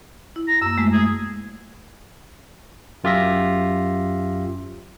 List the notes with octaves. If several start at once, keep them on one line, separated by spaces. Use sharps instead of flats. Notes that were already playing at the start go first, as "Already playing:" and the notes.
E4
A#5
F#2 A#3 E6
G#3 A3
G#4
F#2 F4 G4 E5 A#6